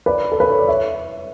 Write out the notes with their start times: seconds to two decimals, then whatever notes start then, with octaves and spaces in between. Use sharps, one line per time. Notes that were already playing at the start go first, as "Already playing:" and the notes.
0.06 B4 D5
0.32 A4
0.40 B4
0.50 C#5
0.58 D5
0.67 C#5 E5